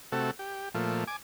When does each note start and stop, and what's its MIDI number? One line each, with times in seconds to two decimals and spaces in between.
0.12 0.31 48
0.12 0.31 57
0.12 0.31 66
0.12 0.31 69
0.39 0.69 67
0.74 1.04 46
0.74 1.04 53
0.74 1.04 57
1.07 1.16 80
1.07 1.16 86